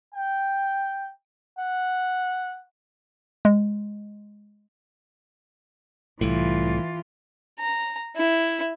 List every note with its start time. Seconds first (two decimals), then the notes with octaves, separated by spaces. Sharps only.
0.14 G5
1.59 F#5
3.45 G#3
6.21 C2 A2 E3 F4
7.59 A#5
8.16 E4